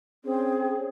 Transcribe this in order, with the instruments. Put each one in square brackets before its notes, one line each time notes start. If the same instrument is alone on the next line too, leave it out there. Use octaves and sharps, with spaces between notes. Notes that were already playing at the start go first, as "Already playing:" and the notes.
[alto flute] C4 [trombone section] C#4 C5 [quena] G#4